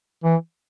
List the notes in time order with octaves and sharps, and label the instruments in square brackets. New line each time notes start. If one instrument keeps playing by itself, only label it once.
[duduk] E3